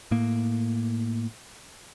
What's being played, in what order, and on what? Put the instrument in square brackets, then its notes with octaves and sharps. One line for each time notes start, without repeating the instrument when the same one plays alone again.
[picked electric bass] A2 A#3